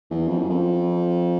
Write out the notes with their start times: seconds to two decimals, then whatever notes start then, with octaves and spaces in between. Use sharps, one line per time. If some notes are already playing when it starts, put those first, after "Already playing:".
0.11 E2
0.28 F2
0.39 F#2
0.49 F2